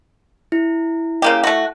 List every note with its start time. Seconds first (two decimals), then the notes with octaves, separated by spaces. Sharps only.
0.52 E4
1.22 C#3 A#3 G4
1.44 A3 F#4